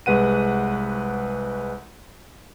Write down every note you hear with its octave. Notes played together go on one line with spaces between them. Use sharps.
C2 G#3 B4 F#5 D#7